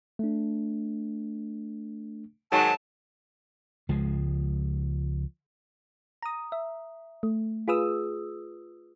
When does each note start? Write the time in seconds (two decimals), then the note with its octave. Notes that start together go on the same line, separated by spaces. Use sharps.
0.19 A3 D4
2.52 G#2 D#3 F#3 A5
3.89 C#2 F3 G#3
6.22 A#5 D#6
6.52 E5
7.23 A3
7.68 F4 G#4 B4 D#6 E6